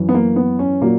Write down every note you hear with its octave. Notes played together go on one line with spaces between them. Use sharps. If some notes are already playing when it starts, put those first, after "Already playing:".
Already playing: F#2 E3
B3
A#3
B3
C#4
A#2 F#3 A#3